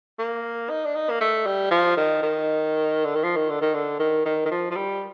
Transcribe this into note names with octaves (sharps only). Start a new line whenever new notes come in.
A#3
D#4
D4
D#4
A#3
A3
G3
F3
D#3
D#3
D3
D#3
F3
D#3
D3
D#3
D3
D#3
D#3
D#3
F3
F3
G3